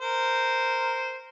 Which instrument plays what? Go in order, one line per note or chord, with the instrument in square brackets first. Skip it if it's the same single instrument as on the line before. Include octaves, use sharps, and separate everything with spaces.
[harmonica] A#4 C5